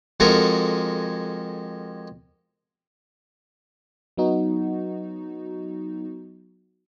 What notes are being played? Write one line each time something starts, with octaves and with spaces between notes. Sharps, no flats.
F2 G#3 F#4 A4 A#4 G#5
F#3 B3 D#4 F#4